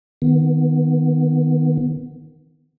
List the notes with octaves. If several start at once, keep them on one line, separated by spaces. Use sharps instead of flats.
D#3 B3